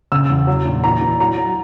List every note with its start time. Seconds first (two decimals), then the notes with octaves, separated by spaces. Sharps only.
0.12 C#3 E6
0.30 E2
0.47 F#3
0.65 A#2
0.84 E3 A#5
1.01 E3
1.20 F#3 A#5
1.37 F#3